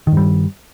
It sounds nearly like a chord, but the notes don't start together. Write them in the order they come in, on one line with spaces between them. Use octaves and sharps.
D#3 G2 G3